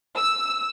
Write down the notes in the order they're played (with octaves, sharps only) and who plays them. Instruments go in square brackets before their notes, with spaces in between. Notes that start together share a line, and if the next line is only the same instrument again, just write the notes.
[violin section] E6